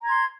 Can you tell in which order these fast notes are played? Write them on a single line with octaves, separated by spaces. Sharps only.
A#5 G#6 C6